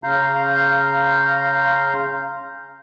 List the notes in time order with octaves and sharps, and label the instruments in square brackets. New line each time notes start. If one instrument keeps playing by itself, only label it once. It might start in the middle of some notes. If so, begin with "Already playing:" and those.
[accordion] C#3 F5 A#5 C6 G6